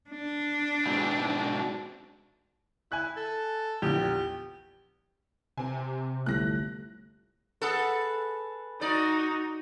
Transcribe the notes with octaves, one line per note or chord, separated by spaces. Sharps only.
D4
G#2 B2 C4
E4 G#5 F#6
A4
A#1 E2 G4
C3 C4 G#5
G1 C2 A3 F#6 A#6
G#4 A4 B4 F#5
D#4 F#4 D5